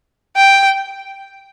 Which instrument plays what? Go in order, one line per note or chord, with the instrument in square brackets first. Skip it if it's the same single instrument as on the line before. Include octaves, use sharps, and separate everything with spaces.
[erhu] G5